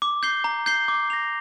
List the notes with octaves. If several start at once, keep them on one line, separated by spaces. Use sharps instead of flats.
D6
G6 C7 G7
A#5
G6 C7 G7
D6
A#6 F7